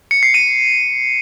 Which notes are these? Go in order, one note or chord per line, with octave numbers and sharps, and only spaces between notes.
C#7
C7
D#7